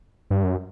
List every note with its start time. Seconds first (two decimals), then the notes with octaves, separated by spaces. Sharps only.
0.30 G2
0.44 F#2